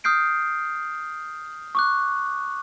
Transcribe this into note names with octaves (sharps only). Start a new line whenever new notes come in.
D#6 F6 G6 C7 D7
C#6 D6 F#6